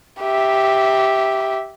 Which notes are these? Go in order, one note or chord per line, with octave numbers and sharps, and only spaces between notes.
G4 E5